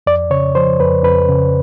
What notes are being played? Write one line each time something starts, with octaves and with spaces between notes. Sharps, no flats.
F2 D5
C#3 C#5
F3 C5
F2 B4
F2 B4
C#3